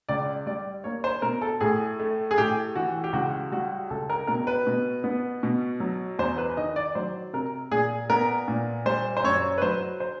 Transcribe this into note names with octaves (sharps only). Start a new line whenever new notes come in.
C#2 D5
G3 D5
A#3 C#5
C5
B2 A#4
A4
A2 G#4
A3
G#4
A2 G4
E3 F#4
G4
C#2 F#4
G3 F#4
C#2 A4
A#4
B2 A#4
B4
B2
B3
B2
F#3
E2 C5
B4
D#3 D#5
D5
F#3 C5
C3 A#4
A#2 G#4
B3 A#4
A#2
G3 C5
C5
F#2 C#5
B4
F#3 C5
C5